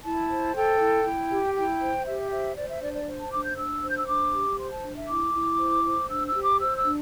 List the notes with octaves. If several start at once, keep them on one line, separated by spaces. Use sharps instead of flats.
E4 A5
C5
A4 G5
E4
E4
G4
E4 G5
C5
G4 E5
C5 E5
C5 D5
E5
D4 D5
D5
C5
A5
D4 D6
G6
D4 E6
C5
G6
E6
D4 D6
G4
C5 C6
A5
D4
E5
E4 D6
E4
C5
C5
D4 E6
E6
G4
D6
C5 E6
E6
D4